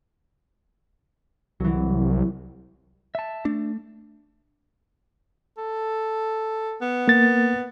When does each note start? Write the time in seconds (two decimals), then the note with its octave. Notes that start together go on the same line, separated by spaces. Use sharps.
1.60 C2 E3 F#3
3.15 E5 A5
3.45 A3 D4
5.58 A4
6.81 B3
7.08 A#3 A6